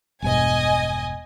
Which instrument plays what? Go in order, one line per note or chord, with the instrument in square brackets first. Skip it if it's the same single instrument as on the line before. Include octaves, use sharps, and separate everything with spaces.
[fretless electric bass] E1 G2 B2 [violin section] D#5 G#5